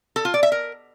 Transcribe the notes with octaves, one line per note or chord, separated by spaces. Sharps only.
A4
F4
D5
E5
A#4